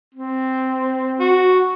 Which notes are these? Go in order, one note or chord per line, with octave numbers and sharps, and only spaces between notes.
C4
F#4